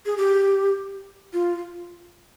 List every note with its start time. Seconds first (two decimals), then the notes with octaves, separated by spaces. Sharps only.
0.06 G#4
0.18 G4
1.33 F4